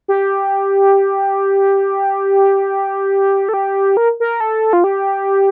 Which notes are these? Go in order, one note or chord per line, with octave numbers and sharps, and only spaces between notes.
G4
A4
G4
A#4
A#4
A4
F4
G4